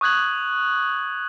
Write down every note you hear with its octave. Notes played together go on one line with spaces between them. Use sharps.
C#6 D#6 F#6 G#6 F#7